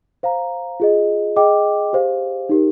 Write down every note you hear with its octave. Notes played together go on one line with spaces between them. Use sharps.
C5 F5 A#5
F4 G#4 D#5
G#4 D#5 G5 D6
G4 C5 F5
D#4 G4 A#4